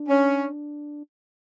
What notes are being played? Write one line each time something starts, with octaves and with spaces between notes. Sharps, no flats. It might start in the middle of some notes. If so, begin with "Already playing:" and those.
Already playing: D4
C#4